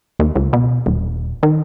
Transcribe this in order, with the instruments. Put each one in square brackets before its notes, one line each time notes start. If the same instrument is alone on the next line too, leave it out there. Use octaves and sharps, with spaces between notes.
[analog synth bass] D#2
C#2
B2
D#1
D#3